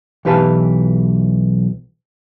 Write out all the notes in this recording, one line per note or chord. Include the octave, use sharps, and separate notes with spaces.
B1 E3 G4 B4 F5 A5